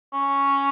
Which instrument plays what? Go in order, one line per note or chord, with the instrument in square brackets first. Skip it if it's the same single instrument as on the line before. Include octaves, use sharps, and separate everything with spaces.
[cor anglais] C#4